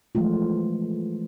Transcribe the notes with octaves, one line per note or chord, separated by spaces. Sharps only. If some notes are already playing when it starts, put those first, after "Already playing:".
E3 F3 G#3 A3 F4